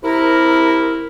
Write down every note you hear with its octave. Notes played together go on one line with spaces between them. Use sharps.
C3 E4 A#4